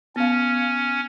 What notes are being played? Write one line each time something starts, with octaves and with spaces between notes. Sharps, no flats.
B3 C#4 F5